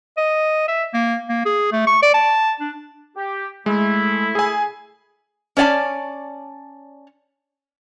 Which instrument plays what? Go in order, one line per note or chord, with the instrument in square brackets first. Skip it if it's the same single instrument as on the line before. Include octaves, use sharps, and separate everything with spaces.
[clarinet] D#5
E5
A#3
A#3
G#4
A3
C#6
D5
A5
D4
[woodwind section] G4
[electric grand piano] G#3 [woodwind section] A3 E4
[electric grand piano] G#4 G#5
[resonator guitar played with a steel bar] C#4 C#5 D5 F#5 A5